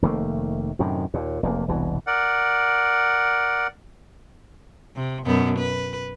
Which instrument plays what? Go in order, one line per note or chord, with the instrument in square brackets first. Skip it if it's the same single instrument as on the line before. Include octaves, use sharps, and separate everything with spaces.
[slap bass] F1 D#3 A3 A#3
F#2 A2 C3 D#3
D#2 A#2
F1 E2 A2 A#3
E1 C2 B2 E3
[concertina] A#4 D5 F#5
[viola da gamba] C3
F#2 B2 B3
B4